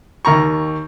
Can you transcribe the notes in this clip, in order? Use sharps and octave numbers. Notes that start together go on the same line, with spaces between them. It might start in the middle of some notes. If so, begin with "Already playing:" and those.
D#2 D#3 A#5 C#6